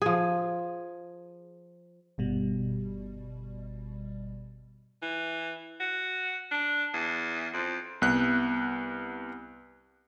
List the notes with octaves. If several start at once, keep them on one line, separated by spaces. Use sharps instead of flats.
F3 G#4
G1 B2 G3
E3
F#4
D4
E2
F2
C2 B3 F#6